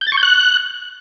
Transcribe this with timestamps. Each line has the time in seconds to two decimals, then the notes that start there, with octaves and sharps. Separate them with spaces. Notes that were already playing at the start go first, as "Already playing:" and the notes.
0.01 G6
0.07 A6
0.12 C#6
0.17 G6
0.23 F#6